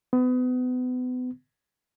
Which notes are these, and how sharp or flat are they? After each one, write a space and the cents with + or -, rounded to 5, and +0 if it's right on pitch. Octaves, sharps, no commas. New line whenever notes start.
B3 +30